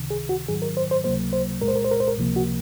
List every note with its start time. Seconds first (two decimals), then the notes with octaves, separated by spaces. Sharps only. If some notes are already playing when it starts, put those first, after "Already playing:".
Already playing: C#2 C3 D#3
0.10 G#4
0.29 F#4
0.48 G#2 D#3 F#3 G#4
0.62 A#4
0.77 C5
0.91 C5
1.04 C#2 C3 F#3 A#3 C5
1.33 C5
1.61 C2 A#2 G#3 A#4
1.68 C5
1.76 A#4
1.84 C5
1.91 A#4
2.00 C5
2.08 A#4
2.17 C#2 C3 F3 A#3
2.36 F#4